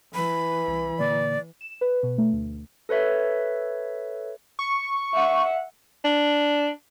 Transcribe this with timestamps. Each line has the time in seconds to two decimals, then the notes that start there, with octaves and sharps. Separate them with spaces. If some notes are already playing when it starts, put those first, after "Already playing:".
0.14 E3 B5
0.68 C2
0.99 A#2 D3 A#3 D5
1.61 E7
1.81 B4
2.03 B2
2.18 A3
2.33 D2
2.89 A4 B4 C#5 E5
4.59 C#6
5.13 E5 F#5
6.04 D4